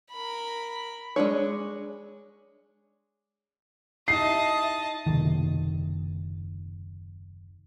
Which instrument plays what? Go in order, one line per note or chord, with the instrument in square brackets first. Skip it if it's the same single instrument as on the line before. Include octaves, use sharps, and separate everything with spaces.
[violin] A#4 B5
[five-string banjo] G#3 A#3 D4 C#5
[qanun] D#4 E4 G4 [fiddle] D#5 A5 [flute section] E5 [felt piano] C7
[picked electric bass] F#1 D#2 C3 D#3